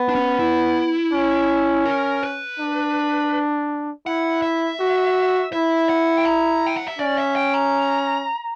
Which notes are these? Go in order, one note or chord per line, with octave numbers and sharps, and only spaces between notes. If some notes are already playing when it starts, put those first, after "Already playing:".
Already playing: B3
D4
C#4
E4
C#4
A#4
B4
D4
E4 F#5
E5
F#4
E4 E5
F#5
G5
A#5
G5
F#5
E5
C#4 D5
E5
G5
A#5